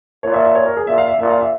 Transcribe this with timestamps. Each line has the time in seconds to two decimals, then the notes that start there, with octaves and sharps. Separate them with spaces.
0.23 A#2 C#5
0.34 E5
0.45 E5
0.55 C#5
0.66 A#4
0.77 G#4
0.87 A#2 E5
0.98 F5
1.08 E5
1.19 A#2 E5
1.30 F5
1.41 E5